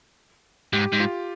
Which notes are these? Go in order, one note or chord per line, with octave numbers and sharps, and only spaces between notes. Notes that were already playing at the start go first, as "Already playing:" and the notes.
G#2 G4
G#2
F4